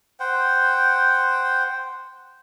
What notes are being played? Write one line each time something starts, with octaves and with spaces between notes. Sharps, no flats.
C5 F#5 G5